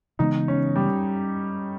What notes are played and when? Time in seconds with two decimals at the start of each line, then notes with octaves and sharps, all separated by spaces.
0.19 C#3 E3 G#3 B3 D#4
0.48 C#4
0.76 G3